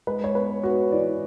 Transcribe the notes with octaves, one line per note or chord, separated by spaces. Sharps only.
G#3 B4
C#5
B3 B4
B3 F#4
E3 D5